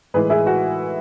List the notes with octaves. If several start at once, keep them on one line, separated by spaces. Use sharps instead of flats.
A2 E3 G#3 G#4 B4
E4 G#4
F#4